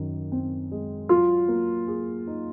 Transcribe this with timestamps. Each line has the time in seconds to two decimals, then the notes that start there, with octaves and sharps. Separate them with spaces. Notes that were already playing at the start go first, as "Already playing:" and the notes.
Already playing: F#2 D#3
0.32 C4
0.72 G#3
1.09 F#3 F4
1.48 A#3
1.87 G#4
2.27 D#4